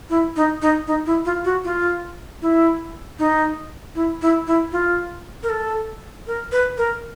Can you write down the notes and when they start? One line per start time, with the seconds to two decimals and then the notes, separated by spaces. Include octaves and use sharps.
0.10 E4
0.36 D#4
0.62 D#4
0.87 D#4
1.06 E4
1.26 F4
1.45 F#4
1.64 F4
2.42 E4
3.19 D#4
3.95 E4
4.22 E4
4.47 E4
4.72 F4
5.43 A#4
5.50 A4
6.27 A#4
6.52 B4
6.78 A#4